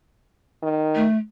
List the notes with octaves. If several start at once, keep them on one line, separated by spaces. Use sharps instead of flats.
D#3
A3